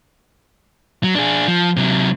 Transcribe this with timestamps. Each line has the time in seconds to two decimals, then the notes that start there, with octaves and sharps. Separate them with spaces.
1.04 F#3
1.15 D4 G#4
1.48 F3
1.77 C3 F#3